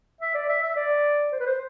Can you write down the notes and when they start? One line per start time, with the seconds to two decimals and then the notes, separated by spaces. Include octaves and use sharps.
0.21 E5
0.35 D5
0.49 E5
0.62 E5
0.76 D5
1.33 C5
1.40 B4
1.46 C5